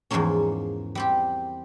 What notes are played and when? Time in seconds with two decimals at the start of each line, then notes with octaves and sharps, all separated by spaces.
0.10 E2 G#2 F3 G#3 A#3 C#4
0.95 G3 C4 G4